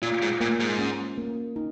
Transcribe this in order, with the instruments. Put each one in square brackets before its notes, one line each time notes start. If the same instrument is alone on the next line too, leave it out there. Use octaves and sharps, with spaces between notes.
[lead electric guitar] A#2 [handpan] F4
[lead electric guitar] G#2
[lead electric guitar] A#2 [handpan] A#3
[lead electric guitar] G#2
[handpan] C#4
A#3
D#4